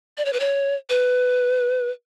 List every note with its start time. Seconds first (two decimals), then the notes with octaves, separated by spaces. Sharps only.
0.18 D5
0.25 C#5
0.33 B4
0.40 C#5
0.90 B4